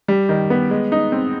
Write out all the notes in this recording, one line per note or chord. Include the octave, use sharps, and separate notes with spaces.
G3
D#3
B3
G#3
D#4
C4